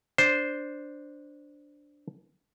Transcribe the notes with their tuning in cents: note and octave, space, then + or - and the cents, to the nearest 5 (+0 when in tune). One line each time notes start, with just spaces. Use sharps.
D4 +0 C5 +0